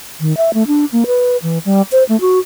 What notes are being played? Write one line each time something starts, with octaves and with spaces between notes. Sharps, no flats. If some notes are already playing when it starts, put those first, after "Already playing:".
D#3
E5
A3
D4
A#3
B4
E3
G3
C5
A3
F#4